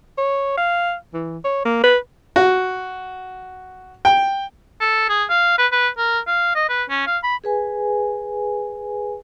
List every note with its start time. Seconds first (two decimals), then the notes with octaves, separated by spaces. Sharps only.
0.18 C#5
0.58 F5
1.14 E3
1.44 C#5
1.65 A#3
1.84 B4
2.36 F#4
4.05 G5
4.81 A4
5.09 G#4
5.29 F5
5.58 B4
5.72 B4
5.98 A#4
6.27 F5
6.55 D#5
6.69 B4
6.90 C#4
7.07 F5
7.23 B5
7.44 G#4 B4 G#5